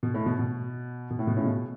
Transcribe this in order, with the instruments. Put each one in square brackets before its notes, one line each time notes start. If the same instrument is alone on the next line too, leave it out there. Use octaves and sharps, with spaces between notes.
[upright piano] B2
A2
B2
B2
B2
A2
B2
A2 C#3
B2